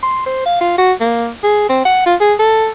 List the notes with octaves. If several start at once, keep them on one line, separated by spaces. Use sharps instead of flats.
C6
C5
F5
F4
F#4
A#3
G#4
C4
F#5
F4
G#4
A4